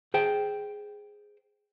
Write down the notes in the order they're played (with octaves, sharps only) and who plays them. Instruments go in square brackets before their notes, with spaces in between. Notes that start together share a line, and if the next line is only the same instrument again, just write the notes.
[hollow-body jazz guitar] G#4 C5 G5